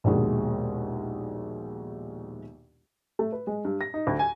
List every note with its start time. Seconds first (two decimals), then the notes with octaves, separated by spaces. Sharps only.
0.04 A#1 D#2 B2 G#3
3.19 A3
3.33 B4
3.47 G#3
3.65 G2
3.81 A#6
3.94 D#4
4.07 D2
4.19 G#5